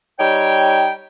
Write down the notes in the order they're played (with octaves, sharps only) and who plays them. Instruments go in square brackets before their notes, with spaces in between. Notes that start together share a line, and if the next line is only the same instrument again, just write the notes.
[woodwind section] G3 D#4 C#5 G5